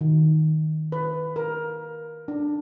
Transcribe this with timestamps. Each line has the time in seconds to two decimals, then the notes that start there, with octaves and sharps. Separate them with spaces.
0.01 D#3
0.92 B4
1.36 A#4
2.28 D4